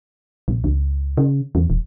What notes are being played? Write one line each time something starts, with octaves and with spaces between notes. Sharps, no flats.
A#1
C#2
C#3
E2
D#1